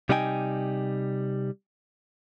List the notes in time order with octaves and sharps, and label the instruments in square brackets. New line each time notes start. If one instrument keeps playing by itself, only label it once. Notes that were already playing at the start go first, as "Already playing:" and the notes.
[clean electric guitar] C3 G3 D#4 D#5 G5 G#5